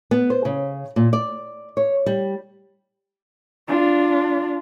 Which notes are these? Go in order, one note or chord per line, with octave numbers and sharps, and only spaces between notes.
B3
C5
C#3
A#2
D5
C#5
G3
D4 F4